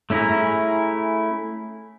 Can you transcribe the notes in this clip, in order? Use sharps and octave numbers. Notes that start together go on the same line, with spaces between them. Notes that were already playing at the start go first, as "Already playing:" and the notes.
A3 C#4 E4 G#4 A#5